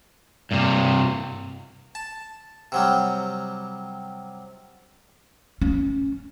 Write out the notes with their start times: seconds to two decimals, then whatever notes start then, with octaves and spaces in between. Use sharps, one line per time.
0.52 G2 C3
1.95 A5
2.72 C3 F#3 G3
5.62 C#4